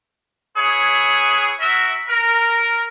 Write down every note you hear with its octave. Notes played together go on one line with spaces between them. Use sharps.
E4 G#4 B4 C#5
F#4 A#4 E5
A#4